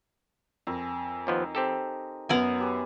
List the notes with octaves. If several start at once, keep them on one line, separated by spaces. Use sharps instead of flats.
F2 A#4 G#5 C6
D#2 F3 B3 D#4
C4 G4 A4
F#2 F#3 B3 A#4 G#5 F7
C#4 G4 B4